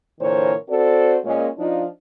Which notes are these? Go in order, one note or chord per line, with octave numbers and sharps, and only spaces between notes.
A#2 D3 E3 A#4 C5 C#5
C4 F#4 A4 C5 D5
A#2 G#3 C#4
F3 D4 D#4 F4